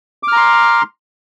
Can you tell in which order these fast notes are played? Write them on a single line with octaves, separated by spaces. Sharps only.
D6 F6 A#5 C6